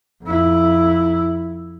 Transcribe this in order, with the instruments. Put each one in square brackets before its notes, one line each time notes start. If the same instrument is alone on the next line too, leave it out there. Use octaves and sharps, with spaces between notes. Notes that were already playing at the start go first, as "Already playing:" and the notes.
[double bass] F2 E4